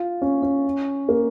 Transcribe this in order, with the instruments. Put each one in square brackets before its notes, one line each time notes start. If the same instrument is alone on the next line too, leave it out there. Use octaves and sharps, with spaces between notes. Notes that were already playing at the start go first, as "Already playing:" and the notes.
Already playing: [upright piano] F4
C#4
C#4
A#3